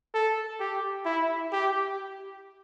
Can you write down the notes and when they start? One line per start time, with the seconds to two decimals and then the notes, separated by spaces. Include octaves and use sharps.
0.14 A4
0.60 G4
1.05 E4
1.52 G4